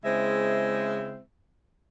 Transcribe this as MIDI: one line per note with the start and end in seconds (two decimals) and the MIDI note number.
0.04 1.20 49
0.04 1.20 56
0.04 1.20 60
0.04 1.20 64
0.04 1.20 72
0.04 1.20 76